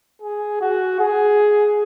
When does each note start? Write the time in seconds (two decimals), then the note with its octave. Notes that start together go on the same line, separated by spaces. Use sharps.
0.22 G#4
0.61 F#4
0.99 G#4